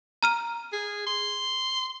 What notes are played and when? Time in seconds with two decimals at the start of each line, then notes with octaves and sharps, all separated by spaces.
0.23 A#5 F6 D#7
0.73 G#4
1.06 C6